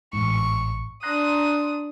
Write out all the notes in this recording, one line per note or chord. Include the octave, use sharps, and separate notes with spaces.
A1 G#2 C#6
D4 A#5 C6 D#6 F#6